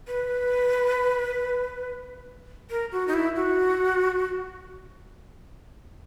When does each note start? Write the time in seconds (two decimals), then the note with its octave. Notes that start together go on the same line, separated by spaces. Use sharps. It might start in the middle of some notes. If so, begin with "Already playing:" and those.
0.08 B4
2.70 A#4
2.92 F#4
3.08 D#4
3.14 E4
3.36 F#4